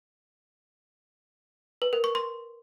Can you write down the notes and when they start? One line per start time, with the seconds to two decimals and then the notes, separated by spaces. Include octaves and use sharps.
1.82 B4
1.93 A#4
2.04 C#6
2.15 C6